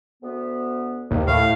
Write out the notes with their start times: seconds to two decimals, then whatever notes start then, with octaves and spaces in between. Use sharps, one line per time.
0.23 D2 B3
1.11 D#2 C3
1.27 A2 A3 F5